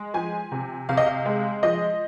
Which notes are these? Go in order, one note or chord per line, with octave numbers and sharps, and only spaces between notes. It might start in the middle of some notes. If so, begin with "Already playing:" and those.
Already playing: G#3
F3 G#5
C3
C3 F5
D#5
F5
G#3
F3 D#5